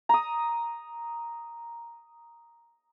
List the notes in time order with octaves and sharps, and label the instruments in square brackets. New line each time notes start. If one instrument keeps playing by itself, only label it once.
[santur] A#5 D#6